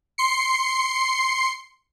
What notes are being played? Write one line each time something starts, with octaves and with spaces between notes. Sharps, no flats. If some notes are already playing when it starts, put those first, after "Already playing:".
C6 C7 C#7